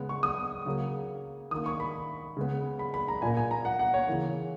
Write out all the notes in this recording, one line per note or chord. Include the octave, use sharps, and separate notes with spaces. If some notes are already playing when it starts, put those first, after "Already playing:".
Already playing: C#3 G#3 B3
C#6
D#6
C#3 F#3 A#3
D#3 A#3 D#6
C#6
B5
C#3 G#3 B3
B5
B5
A#5
A#2 A#3 G#5
G#5
A#5
F#5
F#5
C#5
C#3 E3 A#3